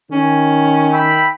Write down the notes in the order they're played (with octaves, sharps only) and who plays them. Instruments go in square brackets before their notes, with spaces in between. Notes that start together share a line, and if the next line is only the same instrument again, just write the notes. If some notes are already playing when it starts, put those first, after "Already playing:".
[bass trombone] D#3 [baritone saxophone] C#4
[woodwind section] E5 G5 B5